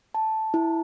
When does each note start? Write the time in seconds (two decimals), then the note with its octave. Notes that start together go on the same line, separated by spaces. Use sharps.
0.14 A5
0.54 E4